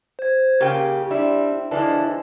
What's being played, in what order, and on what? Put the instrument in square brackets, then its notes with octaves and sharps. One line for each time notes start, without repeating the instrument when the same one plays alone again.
[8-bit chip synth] C5 G#6
[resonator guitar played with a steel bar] C#3 F4 G5 [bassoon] A#3 [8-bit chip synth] G4
[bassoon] G3 [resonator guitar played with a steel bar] C4 E4 [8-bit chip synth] D4
[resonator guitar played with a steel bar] D3 F3 G#3 [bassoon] E3 [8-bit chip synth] E4 D5 A5